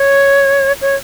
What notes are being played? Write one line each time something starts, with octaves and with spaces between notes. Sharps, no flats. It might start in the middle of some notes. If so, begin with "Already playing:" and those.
Already playing: C#5
C#5